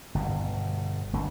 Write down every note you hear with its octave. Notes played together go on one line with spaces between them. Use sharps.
G1 B2
G1 D2 D3